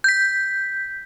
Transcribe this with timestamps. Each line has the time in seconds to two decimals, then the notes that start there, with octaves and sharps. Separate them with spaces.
0.04 G6 B6